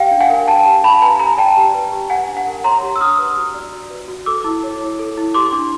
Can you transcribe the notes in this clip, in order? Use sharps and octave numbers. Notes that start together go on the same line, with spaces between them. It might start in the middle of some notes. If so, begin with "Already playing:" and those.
Already playing: G4 F5 G5
D4
F#5 G#5
A#4
D4 G5 A5
G4
D4 A5 B5
B4 G#5 A#5
G4 G#5 A#5
D5 G5 A5
G4
B4
G4
G4 F#5 G#5
D4
F#5
A#4
C#5 A#5 C6
G4
E6
D4 D#6 F6
B4
F#4
D5
F#4
B4
F#4
A4 D6 E6
E4
C#5
E4
A4
E4
G4 C6 D6
D4